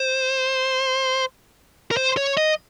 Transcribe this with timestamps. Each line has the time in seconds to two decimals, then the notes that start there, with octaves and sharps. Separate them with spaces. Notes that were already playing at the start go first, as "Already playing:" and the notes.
Already playing: C5
1.91 A#4
1.97 C5
2.17 C#5
2.37 D#5